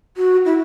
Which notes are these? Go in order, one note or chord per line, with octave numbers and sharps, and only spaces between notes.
F#4
E4